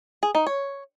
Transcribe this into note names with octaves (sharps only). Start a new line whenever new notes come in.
G#4
D#4
C#5